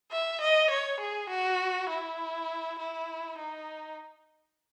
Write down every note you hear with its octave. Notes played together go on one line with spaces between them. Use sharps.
E5
D#5
C#5
G#4
F#4
E4
E4
D#4